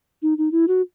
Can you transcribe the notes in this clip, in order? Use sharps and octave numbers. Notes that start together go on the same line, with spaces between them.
D#4
D#4
E4
F#4